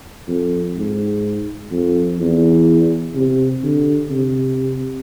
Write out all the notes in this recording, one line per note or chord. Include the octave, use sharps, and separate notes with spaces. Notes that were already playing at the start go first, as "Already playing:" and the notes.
F2
G#2
F2
E2
C3
D3
C3